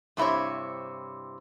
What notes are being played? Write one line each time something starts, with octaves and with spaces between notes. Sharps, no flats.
G2 C3 E4 C5 C#5